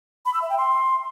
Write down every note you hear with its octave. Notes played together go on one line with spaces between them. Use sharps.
B5
E6
E5
G5
C6